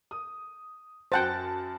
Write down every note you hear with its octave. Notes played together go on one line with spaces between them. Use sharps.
D#6
F#2 C5 F#5 G5 A5 A6